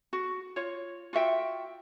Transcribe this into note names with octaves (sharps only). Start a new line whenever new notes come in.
F#4
F4 C#5
F4 F#4 E5 G5